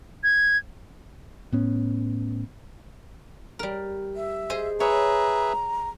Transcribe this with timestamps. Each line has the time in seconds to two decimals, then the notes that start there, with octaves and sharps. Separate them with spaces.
0.23 G#6
1.52 A2 B3 C#4
3.59 G3 A#4
4.16 E5
4.50 G#4 C5 D#5
4.80 G#4 B4 C#5 E5 A#5